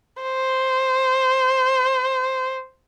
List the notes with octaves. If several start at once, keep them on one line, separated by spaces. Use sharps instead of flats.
C5